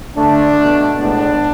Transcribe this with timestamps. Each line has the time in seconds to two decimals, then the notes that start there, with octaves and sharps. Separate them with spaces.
0.16 D3 A3 D4
0.58 B2 A3
0.98 A2 G#3 B3 D4